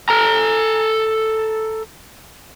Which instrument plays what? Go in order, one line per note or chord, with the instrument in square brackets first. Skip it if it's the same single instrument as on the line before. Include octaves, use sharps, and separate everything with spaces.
[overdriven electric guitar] A4 A#5